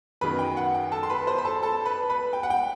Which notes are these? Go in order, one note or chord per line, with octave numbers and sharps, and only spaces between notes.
F#2 D#3 F#3 B3 D#4 B4 B5
G5
F#5
G5
A4 A5
C6
B4 B5
C5 C6
B5
A4 A5
A4 A5
B4 B5
B4 B5
G5
F#5
G5